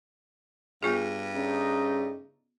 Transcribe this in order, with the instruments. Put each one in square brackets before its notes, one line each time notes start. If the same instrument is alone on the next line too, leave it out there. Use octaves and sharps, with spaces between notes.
[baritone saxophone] G2 [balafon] B3 F4 G#4
[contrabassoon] C#3 [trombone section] A3 D4 D#4